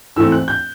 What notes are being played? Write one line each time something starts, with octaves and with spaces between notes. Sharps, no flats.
G#2 E3 A3 C4 E6
F#6
G6